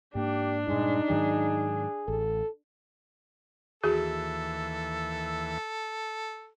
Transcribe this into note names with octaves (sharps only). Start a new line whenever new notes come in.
G#2 A#3 D4 G4
G2 A#2 G#3 D#4
G#2 D#3 F#3 G#4
A1 A4
D#2 E3 F#4 G#4 A4 E5